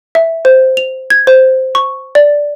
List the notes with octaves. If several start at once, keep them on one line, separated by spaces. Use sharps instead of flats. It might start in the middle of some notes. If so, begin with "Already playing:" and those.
E5
C5
F7
G#6
C5
C#6
D5